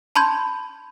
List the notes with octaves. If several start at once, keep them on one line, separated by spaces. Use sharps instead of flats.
A5 B5 C6 G6 G#6